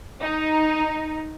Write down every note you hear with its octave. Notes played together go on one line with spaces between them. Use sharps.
D#4